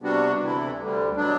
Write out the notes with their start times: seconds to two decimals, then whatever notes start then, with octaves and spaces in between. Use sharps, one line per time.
0.02 C3 G3 B3 D4 F#4
0.40 D2 C3 E3 A3 E4
0.78 D2 D3 G3
1.16 B2 F#3 B3 D4